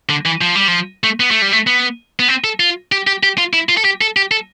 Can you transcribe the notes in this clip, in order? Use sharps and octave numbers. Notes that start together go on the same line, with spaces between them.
D3
E3
F3
G3
F3
A3
B3
A3
G3
A3
B3
B3
C4
A4
F4
G4
G4
G4
F4
E4
F4
A4
G4
A4
G4
A4